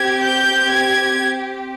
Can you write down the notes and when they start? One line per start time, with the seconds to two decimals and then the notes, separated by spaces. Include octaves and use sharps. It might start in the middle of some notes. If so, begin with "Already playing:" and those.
Already playing: C4 G4 G#6
0.25 G6
0.71 G#6